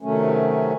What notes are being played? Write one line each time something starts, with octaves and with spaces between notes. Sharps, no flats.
C3 D#3 F#3 A3 C#4